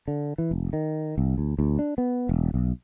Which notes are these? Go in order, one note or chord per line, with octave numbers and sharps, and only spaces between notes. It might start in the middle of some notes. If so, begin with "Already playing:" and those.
D3
E3
F1
D#3
C2
D2
D2
D4
B3
E1
B1